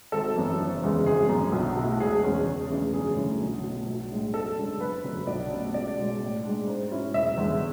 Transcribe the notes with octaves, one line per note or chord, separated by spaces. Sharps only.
G#1 A4
F#2 E3
F#1
E2 C#3 E3 G#3
G#1 G#4
F#2 D3
B1
B2 A3 E4
E1 G#4
E2 C#3 G#3 C#4
E2
C#3 E3 A3 D4
F#2 G#4
D3 A3 C#4 E4
B1
B2 A3
B1
A2 G#3 D4
F#2 A4
C#3 G#3 D4
F#1 B4
F#2 D3
B1 D5
B2 A3 C#4
C#2 D5
B2 G#3
A2
G#3 D4
G#2
F#3 C#4 E4
E1 E5
E2 D3 G#3